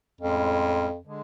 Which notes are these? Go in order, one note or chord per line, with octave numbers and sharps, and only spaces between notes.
F2 A2 G#3 C#4
D3 G#3